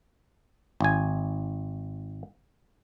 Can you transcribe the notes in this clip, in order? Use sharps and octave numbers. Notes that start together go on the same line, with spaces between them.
G#1 G#5